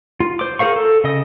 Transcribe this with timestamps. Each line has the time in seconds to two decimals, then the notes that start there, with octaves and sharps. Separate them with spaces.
0.20 F4
0.39 C5 D6
0.59 G#4 A#4 C5 F5 C#6
0.76 A4
1.04 C#3 D#5 D#6